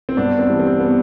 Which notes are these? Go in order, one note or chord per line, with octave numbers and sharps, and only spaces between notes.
C4
G2 B3 D4
C4
E3 G3
C4
B3